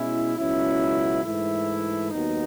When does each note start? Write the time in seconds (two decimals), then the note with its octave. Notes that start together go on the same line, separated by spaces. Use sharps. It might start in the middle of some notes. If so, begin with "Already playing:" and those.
Already playing: B2 G#3 C#4 E4
0.38 C#2 B2 F#3 C#4 E4
1.24 G#2 E3 A3 E4
2.11 D#2 D#3 F#3 B3 D#4